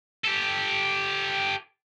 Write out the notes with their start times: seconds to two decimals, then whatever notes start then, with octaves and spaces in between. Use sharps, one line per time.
0.25 G4 A4